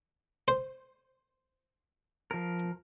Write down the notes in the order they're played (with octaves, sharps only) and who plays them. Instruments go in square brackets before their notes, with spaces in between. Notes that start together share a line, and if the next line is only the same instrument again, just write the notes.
[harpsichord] C5
[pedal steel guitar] F3 A#4